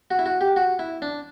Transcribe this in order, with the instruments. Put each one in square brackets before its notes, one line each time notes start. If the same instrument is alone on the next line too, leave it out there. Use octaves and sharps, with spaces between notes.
[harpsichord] F#4
E4
F#4
G4
F#4
E4
D4